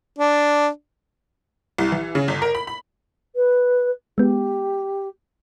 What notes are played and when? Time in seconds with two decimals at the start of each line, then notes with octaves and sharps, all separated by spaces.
0.19 D4
1.78 C2
1.92 E3
2.15 C#3
2.28 G1
2.42 A#4
2.55 B5
2.67 B5
3.35 B4
4.18 G#3 B3 G4